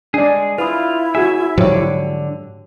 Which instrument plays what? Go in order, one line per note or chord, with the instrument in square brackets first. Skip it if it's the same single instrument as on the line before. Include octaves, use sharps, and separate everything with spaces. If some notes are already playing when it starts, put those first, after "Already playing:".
[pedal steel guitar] G#3 G#4 [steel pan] D4 D5
[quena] E4 [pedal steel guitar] F4 [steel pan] B4 D#6
[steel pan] F#4 G#4 G#5 [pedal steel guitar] E5
[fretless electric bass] G#2 F3 F#3 [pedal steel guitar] D3 [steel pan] G4 C#5